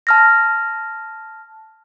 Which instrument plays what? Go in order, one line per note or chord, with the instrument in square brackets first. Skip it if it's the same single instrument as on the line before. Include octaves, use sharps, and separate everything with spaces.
[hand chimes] A5 F6 A#6